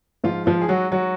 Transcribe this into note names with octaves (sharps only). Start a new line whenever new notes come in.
G#2 F3 F4
F3 F4
G#4
F#3 F#4
F#3 F#4